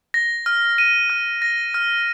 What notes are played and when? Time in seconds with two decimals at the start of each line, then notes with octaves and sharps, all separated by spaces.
0.14 A#6
0.46 F6
0.78 D#7
1.10 F6
1.42 A#6
1.74 F6